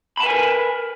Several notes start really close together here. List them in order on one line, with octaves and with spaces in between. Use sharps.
B5 A5 B4 G#5 A#4